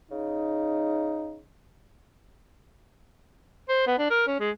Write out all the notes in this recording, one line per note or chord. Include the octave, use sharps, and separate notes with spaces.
C#3 D#4
C5
B3
D4
A#4
C#4
G#3